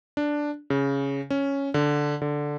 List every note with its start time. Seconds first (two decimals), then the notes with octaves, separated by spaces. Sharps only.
0.17 D4
0.70 C#3
1.30 C#4
1.74 D3
2.22 D3